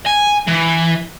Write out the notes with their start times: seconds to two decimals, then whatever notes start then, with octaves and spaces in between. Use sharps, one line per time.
0.06 G#5
0.48 E3